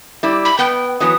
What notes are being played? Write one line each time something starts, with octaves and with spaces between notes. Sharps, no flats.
G3 E4 D5
B5
B3 G5
E3 F#3 B3 D#6